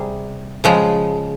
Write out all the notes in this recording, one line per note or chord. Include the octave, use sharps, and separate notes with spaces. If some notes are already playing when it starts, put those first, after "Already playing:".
Already playing: C3 G3 G#4
C#3 F3 G#3